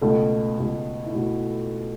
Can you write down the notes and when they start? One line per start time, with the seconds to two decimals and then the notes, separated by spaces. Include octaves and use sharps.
0.01 C#2 B2 A3 A4
0.58 C#2 B2 A3
1.06 E4
1.14 B2 A3 F#4